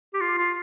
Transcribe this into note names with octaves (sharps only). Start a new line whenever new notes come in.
G4
F4
F4